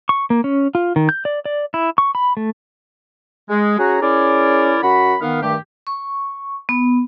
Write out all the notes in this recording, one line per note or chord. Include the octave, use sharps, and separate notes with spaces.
C#6
A#3
C#4
F4
D#3
G6
D5
D5
E4
C#6
B5
A3
G#3
C#4 F#4 G#4 F#5 G#5 A#5
C#4 E4 G#4 A#4 D5
F#2 F#4 F#5 B5
D#3 B3 F5
G2 D#3 A3 G4
C#6
B3